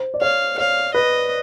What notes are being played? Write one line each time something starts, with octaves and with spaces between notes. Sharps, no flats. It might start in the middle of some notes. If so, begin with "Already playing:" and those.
Already playing: C5
D5
C#5 F5
C#5 F5
B4 D#5